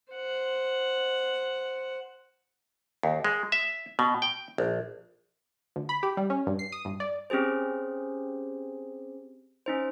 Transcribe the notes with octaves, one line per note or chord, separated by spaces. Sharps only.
C5 F#5
D#2
G#3
E5
B2
G5
A#1
D2
B5
G4
G3
C#4
G2
C7
D#6
G2
D5
C4 C#4 G4 G#4 C5
C#4 D#4 C5